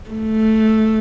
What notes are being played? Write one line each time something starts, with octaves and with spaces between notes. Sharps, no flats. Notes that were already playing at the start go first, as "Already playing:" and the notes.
A3